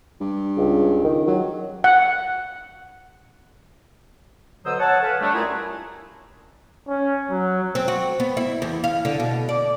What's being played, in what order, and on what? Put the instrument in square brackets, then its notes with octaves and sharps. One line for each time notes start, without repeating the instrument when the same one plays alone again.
[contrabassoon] G2
[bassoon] C#2
D#3
[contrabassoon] F#3
[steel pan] F#5
[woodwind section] B2 D3 F#3 C5 D#6 E6
C#5 F#5 A5
A4 B4 C#5 F5 F#5 G#5
G3 A3 D4
F#2 E4 F4 G#4 G#5 A#5
[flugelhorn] C#4
F#3
[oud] C4
F#4
B3
E4
E2
F5
D3
B2
D5